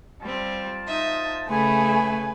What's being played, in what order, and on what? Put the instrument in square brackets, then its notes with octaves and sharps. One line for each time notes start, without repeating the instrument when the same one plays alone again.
[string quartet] G3 C4 [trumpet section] F4 C5 A5
[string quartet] D#4 E5 D#6
[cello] C#3 A3 [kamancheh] G#4 G#5 [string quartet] B4 [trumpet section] B5